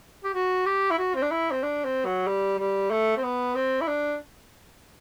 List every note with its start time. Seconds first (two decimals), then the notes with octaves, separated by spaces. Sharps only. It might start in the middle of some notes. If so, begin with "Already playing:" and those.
0.24 G4
0.34 F#4
0.66 G4
0.91 E4
0.99 F#4
1.15 C4
1.22 D4
1.31 E4
1.51 C4
1.63 D4
1.84 C4
2.05 F#3
2.27 G3
2.59 G3
2.91 A3
3.17 C4
3.23 B3
3.55 C4
3.81 E4
3.88 D4